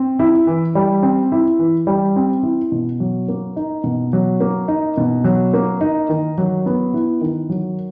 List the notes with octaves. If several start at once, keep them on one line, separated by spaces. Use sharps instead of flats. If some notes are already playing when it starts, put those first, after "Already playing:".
Already playing: C4
E4
E3
G3
C4
E4
E3
G3
C4
E4
B2
F#3
A#3
D#4
B2
F#3
A#3
D#4
B2
F#3
A#3
D#4
D#3
F#3
B3
E4
D#3
F#3